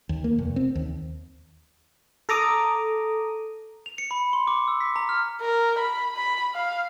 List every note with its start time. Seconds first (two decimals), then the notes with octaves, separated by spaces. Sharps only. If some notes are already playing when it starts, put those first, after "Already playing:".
0.09 D#2
0.24 A#3
0.38 F1
0.56 C4
0.75 D#2
2.29 A4 A#5 D6 D#6
3.86 F7
3.98 C#7
4.11 B5
4.33 C6
4.47 D6
4.68 E6
4.81 B6
4.96 A#5
5.09 F6
5.41 A#4
5.79 B5
6.16 B5
6.55 F5